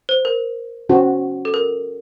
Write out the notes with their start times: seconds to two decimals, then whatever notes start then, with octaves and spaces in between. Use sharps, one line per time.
0.09 C5
0.25 A#4
0.89 C#4 F#4 C5
1.45 A4
1.54 A#4